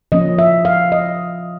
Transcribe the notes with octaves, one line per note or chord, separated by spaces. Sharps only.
F3 A#3 C#4 D#5
E5
F5
D#5